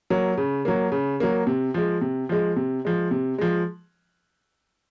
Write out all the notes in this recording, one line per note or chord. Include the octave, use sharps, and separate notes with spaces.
F#3 A#3
C#3
F#3 A#3
C#3
F#3 A#3
C3
F3 G#3
C3
F3 G#3
C3
F3 G#3
C3
F3 G#3